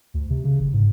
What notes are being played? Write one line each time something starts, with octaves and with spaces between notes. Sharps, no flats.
D2
C3
C#3
F#1
G#2